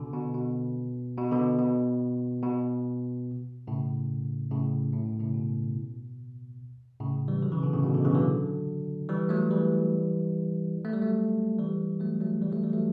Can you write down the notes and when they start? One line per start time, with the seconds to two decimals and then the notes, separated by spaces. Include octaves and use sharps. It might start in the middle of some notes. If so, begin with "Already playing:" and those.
Already playing: B2 D3
0.13 B2
0.35 B2
1.17 B2
1.31 B2 D3
1.59 B2
2.43 B2
3.67 A2 C#3
4.51 A2 C#3
4.93 A2
5.06 B2
5.20 A2 C#3
5.34 B2
7.00 A2 C#3
7.28 E3 G3
7.43 D3 F#3
7.52 C#3 E3
7.63 B2 D3
7.73 A2 C#3
7.84 B2
7.94 B2 D3
8.05 C#3 E3
8.15 D3 F#3
9.09 E3 G3
9.29 F#3 A3
9.51 E3 G3
10.85 A3
10.93 G3
11.02 F#3 A3
11.59 E3 G3
12.00 F#3 A3
12.21 F#3 A3
12.41 E3 G3
12.52 F#3 A3
12.63 E3 G3
12.73 F#3 A3